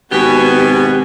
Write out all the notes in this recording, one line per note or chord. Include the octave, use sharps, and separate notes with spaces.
G#1 B2 F#4 G4 G#5